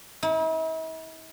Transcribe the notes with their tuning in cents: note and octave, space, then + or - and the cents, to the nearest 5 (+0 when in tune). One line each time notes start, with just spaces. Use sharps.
E4 -45